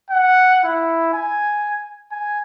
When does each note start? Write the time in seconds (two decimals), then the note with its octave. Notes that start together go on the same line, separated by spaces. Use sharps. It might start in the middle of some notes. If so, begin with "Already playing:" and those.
0.11 F#5
0.64 E4
1.14 G#5
2.12 G#5